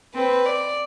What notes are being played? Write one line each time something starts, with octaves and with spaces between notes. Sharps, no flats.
C4 B4
D5